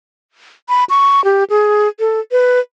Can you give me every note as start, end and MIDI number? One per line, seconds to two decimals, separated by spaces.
0.69 0.84 83
0.90 1.24 85
1.24 1.44 67
1.50 1.88 68
1.99 2.20 69
2.32 2.60 71